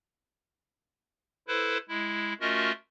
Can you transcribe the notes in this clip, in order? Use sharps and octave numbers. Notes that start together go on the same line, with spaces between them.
E4 A4 B4 C5
G#3 E4
A3 C#4 F4 F#4 A#4 D#5